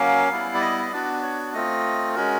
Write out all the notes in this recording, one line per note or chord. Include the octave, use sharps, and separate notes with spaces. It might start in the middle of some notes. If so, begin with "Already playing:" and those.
Already playing: F#3 A#3 C#4 F5
G3 B3 E4
D5
D#5
D#5
B3 D4 F#4 D5
C#5
A3 C4 F4 D#5
G#3 C#4 F#4 A#4